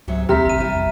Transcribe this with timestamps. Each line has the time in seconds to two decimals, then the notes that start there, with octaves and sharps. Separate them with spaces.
0.08 C#2 G#2 C3 F#3
0.29 D#2 C3 E4 A#5 F6 B6
0.45 A1 A#5 D#7
0.58 A1 G3 E4
0.75 F2